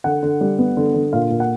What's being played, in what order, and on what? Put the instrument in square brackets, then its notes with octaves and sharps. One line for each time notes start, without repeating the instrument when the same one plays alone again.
[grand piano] D3 F#5
D3
G3
B3
D3
D3
A#2 F5
A#2
F#5